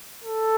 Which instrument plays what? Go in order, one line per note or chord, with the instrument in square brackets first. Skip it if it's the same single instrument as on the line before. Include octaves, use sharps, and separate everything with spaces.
[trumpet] A4